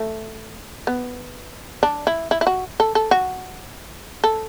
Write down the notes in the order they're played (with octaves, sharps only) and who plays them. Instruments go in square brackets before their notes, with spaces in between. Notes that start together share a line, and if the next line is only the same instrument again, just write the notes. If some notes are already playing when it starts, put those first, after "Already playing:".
Already playing: [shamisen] A3
B3
D4
E4
E4
E4
F#4
A4
A4
F#4
A4